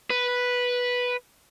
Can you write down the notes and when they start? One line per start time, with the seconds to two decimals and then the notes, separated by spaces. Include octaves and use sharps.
0.10 B4